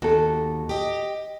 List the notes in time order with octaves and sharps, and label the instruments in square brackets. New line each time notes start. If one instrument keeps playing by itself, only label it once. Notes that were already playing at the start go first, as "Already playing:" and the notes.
[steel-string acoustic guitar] D#2 [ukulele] F#4 A4
[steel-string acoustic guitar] G4 D#5